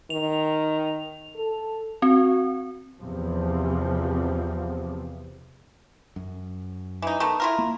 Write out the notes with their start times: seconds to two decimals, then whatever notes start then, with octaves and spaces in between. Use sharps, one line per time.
0.10 D#3 F7
1.35 A4
2.02 C4 F#4
3.00 E2 C3 F3
6.16 F#2
7.02 E3 D#4
7.20 D#3 A3 B3
7.40 E4 F4 A#4
7.58 A#3